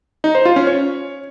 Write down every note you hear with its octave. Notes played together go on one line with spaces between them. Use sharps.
D#4
C5
F4
C#4
C#5